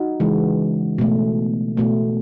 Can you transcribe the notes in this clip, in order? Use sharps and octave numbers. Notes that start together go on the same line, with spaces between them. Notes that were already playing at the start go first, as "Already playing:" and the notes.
Already playing: D#4 F#4
C#3 E3 G#3
B2 A3
B2 A3